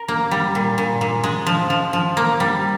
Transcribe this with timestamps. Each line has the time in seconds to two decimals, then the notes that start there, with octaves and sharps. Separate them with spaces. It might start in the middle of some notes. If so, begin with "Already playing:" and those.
Already playing: A#4
0.08 A#3
0.31 G3
0.55 A#2
0.78 A#2
1.01 A#2
1.24 G#3
1.47 F3
1.70 F3
1.93 F3
2.17 A#3
2.40 G3